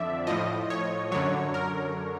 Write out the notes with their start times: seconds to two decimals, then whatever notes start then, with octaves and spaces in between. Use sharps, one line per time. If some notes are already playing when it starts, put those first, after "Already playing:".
Already playing: F2 D3 F3 D5 E5
0.27 A2 F3 D#5
0.70 C#5
1.12 F#2 D3 F#3 C#5
1.54 A#4